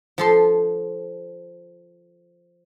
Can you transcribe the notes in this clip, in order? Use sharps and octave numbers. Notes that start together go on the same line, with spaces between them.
F3 A4 C6